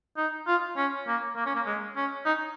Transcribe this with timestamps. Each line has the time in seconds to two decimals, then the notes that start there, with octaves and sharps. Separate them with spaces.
0.17 D#4
0.47 F4
0.77 C#4
1.07 A#3
1.36 A#3
1.46 C#4
1.55 A#3
1.66 G#3
1.96 C#4
2.26 D#4